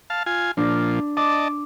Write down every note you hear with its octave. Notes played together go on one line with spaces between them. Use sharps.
F5 A5
F4 G#5
A#2 F3 D4 A#6
D5 D#5 A5 D6